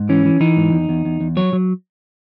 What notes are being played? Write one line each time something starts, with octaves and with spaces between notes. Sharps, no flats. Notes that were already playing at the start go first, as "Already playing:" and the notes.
Already playing: G#2
E3 C#4
E3
E3 D#4
G#2
E2
E2
E2
E2
F#3 C#5
F#3